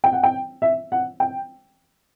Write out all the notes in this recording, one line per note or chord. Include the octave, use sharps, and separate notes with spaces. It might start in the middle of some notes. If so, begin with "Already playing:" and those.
G5
F#5
G5
E5
F#5
G5